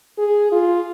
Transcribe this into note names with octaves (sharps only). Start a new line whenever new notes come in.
G#4
F4